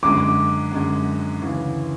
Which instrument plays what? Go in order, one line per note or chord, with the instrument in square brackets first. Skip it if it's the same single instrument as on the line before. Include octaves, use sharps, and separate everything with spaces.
[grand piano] F#2 D3 G#3 [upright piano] D6
[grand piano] F#2 D3 G#3
D2 C#3 E3